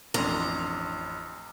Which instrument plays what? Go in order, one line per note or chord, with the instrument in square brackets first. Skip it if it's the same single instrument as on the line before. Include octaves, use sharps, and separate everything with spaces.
[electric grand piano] A1 F2 C6 [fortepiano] C#4 D4 C#5 [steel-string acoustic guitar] A#5